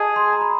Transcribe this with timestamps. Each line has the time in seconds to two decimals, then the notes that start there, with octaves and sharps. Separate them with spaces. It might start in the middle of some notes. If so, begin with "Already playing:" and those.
Already playing: G#4 D#5 A5
0.16 C6
0.33 A#5
0.41 B5